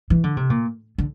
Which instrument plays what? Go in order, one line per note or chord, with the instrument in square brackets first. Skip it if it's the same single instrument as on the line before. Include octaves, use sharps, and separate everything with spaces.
[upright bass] E3
D3
C3
A#2
D3